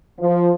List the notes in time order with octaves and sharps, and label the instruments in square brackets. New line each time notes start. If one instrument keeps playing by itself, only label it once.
[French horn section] F3